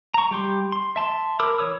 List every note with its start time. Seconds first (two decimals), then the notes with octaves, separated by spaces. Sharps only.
0.14 A#5 C#6
0.31 G3 G4 C6
0.72 C6
0.96 E5 A5 C6
1.40 A#4 B5 D6 E6 F6
1.58 E3 C#5 D#6 E6